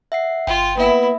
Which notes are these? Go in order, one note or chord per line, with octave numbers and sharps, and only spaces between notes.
E5 F#5 C7
G1 F4 G5
A#3 B3 E4 E5